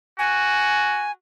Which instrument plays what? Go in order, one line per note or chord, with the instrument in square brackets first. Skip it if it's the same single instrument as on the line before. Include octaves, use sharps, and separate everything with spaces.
[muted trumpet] F#4 [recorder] G#5